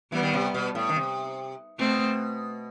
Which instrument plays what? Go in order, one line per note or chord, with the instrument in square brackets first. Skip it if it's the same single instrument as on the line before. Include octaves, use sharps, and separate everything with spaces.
[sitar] E3 [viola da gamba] G3 B3
[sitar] D#3
C3
B2
A2
D#3
C3
[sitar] B2 [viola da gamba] A3 C4